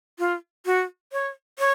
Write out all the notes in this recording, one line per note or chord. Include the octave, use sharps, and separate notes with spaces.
F4
F#4
C#5
C#5